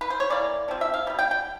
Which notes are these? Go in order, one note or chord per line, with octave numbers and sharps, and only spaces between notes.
B4
C5
C#5
E3 G3 A#3 D5
C3 F3 C4
E5
F5
B2 G3 B3
G5
G5